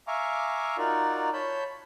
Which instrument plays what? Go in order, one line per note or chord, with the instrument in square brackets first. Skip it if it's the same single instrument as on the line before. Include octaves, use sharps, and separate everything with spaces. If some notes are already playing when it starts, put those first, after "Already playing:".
[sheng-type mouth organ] E5 F5 G#5 A#5 C#6 D6
D#4 F4 F#4 A#4 D5
C#5 A5 B5 G6